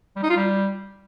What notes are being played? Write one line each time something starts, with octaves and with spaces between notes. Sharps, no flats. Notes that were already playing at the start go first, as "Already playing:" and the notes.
G3
D#4
F4
G3